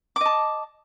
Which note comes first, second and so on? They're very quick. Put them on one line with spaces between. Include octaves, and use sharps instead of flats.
D6 D#5 A5